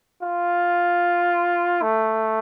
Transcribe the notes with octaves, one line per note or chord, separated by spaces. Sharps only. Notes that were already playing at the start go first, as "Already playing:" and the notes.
F4
A3